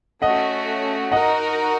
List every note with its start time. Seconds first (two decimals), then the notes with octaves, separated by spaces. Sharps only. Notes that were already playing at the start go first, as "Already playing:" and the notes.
0.22 A3 C#4 F#4 D#5 F#5
1.12 D#4 F#4 A#4 D#5 F#5